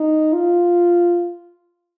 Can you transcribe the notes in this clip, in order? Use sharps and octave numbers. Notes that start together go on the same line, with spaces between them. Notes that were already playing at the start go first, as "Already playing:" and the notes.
Already playing: D#4
F4